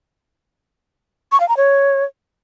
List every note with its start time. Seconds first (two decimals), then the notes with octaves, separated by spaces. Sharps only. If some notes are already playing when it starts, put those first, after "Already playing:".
1.32 C#6
1.40 F5
1.49 A#5
1.57 C#5